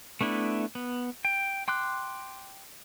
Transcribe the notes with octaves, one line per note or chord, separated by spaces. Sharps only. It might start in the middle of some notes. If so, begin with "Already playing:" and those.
A3 B3 D4 E4
B3
G5
G5 C6 D6 F#6